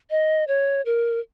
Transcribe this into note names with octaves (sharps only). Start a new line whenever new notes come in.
D#5
C#5
A#4